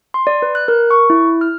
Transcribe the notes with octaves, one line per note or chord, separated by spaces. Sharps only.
C6
D5
B4
F#6
A#4
C#6
E4
F6